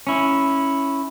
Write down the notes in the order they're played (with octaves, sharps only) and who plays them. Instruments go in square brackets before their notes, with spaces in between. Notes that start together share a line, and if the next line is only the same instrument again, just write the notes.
[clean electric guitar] C#4 E4